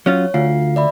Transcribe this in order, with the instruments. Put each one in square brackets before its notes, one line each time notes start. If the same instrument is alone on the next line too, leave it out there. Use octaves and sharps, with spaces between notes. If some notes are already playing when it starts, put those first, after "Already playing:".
[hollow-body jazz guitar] F#3 C#4 F4 [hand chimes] C#5
[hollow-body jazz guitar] D2 [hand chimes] F4 F5 C7
[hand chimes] D5 E5 B5